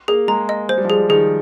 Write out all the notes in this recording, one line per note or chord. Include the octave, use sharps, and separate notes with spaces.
A#3 G#4
G#3 A#5
D#5
G#3 C5
G3
F3
G3 G#4
D#3 G#4